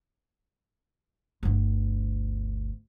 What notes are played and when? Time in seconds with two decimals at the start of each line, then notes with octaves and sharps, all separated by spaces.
1.43 G1 D2